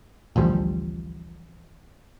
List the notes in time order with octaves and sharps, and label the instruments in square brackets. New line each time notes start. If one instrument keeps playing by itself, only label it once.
[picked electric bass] A1 D2 F3 G3